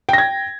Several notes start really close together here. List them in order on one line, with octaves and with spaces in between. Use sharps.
G5 A#6 G#6